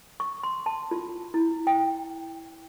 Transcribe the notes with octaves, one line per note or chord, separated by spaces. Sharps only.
C#6
C6
A5
F4
E4
G5